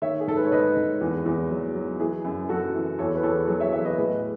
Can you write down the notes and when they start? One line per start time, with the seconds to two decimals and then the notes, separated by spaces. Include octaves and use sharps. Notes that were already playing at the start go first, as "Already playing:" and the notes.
0.02 D#3 C#5 E5
0.20 G#4
0.27 G#2 A4
0.36 B4
0.44 C#5
0.52 G#2 B4 D#5
0.76 G#2
1.01 E2
1.26 E2
1.50 F#3
1.75 F#3
2.00 E3 G#4
2.25 F#2
2.49 F#2 F#4 A4
2.75 E3
2.99 E2 A4 C#5
3.15 B4
3.23 E2 A4 C#5
3.48 F#3 G#4
3.60 C#5 E5
3.73 E2 C#5 E5
3.85 B4 D#5
3.97 A2 G#4 B4